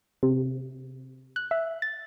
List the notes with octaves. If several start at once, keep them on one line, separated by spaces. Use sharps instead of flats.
C3
F#6
E5
A6